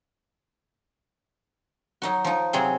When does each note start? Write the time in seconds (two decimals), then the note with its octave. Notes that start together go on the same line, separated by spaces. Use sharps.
2.02 F#3 D#4 F#4
2.24 F3 D#4
2.53 C3 F#3 C4 G#4